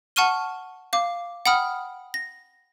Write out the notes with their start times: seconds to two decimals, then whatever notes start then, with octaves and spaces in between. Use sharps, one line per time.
0.16 F#5 A5 C#6 F6 D#7 G7
0.93 F5 D6
1.46 F#5 G5 B5 D#6 F6
2.14 A#6